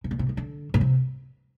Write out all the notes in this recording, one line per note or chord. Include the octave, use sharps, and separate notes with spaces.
C3
A#2
C3
D#3
D3
A#2
C3